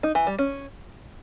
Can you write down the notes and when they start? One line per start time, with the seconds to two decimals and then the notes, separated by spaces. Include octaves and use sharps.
0.03 D#4
0.15 E3
0.27 G3
0.39 C#4